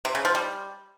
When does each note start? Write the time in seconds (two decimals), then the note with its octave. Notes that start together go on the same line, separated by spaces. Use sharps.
0.05 C3
0.15 C#3
0.25 F3
0.35 G3